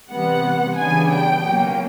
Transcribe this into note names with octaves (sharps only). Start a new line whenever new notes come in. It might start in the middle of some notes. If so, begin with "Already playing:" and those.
C3 E3 G3 B3 F#5
C#3 E3 G3 B3 D4 G#5
G5
B2 F#3 A#3 C#4